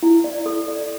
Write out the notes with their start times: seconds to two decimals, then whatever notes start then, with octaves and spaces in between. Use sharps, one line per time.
0.03 E4
0.24 D5
0.46 A4
0.68 D5